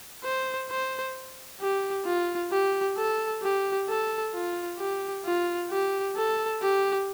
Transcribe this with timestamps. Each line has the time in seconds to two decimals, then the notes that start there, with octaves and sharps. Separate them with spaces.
0.24 C5
0.70 C5
1.61 G4
2.05 F4
2.52 G4
2.97 A4
3.42 G4
3.89 A4
4.34 F4
4.79 G4
5.25 F4
5.71 G4
6.16 A4
6.62 G4